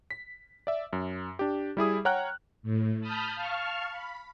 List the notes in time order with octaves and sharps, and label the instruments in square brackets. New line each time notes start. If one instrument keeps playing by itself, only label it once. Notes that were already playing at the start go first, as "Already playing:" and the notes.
[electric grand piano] B6
D5 E5
F#2
D4 G4
G3 E4 G#4 D#6
C#5 F#5 G5 A#5 F6 F#6
[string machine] A2
A5 B5 D#6 F6 G6
F5 A5 C#6 F6
B5